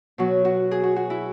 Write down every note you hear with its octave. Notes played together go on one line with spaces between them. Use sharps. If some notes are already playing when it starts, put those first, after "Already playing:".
B2 F#3 F#4
F#4
G#4
F#4
F#4
E4